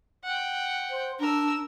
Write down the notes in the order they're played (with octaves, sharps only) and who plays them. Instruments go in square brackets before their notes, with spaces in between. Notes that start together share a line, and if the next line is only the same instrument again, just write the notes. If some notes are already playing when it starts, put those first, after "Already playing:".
[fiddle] F#5 G5
[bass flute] C5
[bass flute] D4 [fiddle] A#4 E6